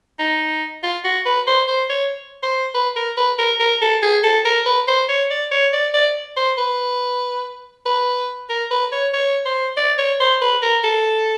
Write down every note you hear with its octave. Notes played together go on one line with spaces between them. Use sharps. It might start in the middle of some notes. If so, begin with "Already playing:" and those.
D#4
F4
F#4
B4
C5
C5
C#5
C5
B4
A#4
B4
A#4
A#4
A4
G#4
A4
A#4
B4
C5
C#5
D5
C#5
D5
D5
C5
B4
B4
A#4
B4
C#5
C#5
C5
D5
C#5
C5
B4
A#4
A4